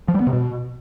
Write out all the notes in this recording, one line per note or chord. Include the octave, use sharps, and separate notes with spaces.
F3
G3
B3
C3
B2